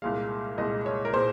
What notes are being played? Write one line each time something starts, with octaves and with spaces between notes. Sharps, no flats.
C2 A#2 G#3 F5
C2 A#2 G#3 D#5
C#5
A#4
A#2 G#3 C5